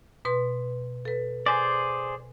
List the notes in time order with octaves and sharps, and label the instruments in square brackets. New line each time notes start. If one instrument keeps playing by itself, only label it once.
[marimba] B2 B4 C6
A4 B4
[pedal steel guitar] G#4 C5 D5 [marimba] G#5